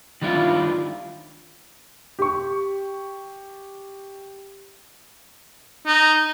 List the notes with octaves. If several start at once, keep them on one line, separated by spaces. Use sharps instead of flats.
D#3 G3 D4 E4 F4
G4 C#6
D#4